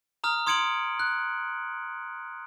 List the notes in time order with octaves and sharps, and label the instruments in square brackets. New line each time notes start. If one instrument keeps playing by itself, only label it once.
[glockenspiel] A#5 D#6 F6
C6 D#6 G#6 C#7 D7 F#7
F#6